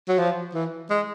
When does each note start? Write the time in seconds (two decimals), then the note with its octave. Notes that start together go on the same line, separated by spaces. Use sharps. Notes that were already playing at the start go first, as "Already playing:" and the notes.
0.08 F#3
0.19 F3
0.54 E3
0.90 G#3